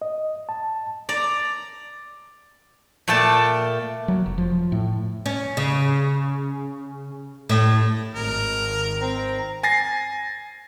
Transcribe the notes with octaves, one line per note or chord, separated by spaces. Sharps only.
D#5
A5
D5 A#5
A#2 A3 D5 G5 A5
F#3
F1
F3
A2
C#4
C#3
A2
G#1 D#3 A#4
C4 A#5
G#5 A6 A#6 C7